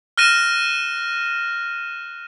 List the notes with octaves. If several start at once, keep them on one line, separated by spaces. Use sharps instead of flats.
F6 F#6 A#6 D#7 E7